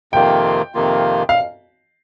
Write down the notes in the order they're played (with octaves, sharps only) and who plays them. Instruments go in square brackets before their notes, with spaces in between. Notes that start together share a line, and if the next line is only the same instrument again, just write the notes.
[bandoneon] F2 C3 D#3 A#3 F4 [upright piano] G5
[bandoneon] F2 C3 D#3 A#3 F4
[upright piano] F5